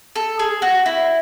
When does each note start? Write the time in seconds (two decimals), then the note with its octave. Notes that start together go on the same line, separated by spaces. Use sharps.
0.16 A4
0.39 G#4
0.62 F#4
0.86 E4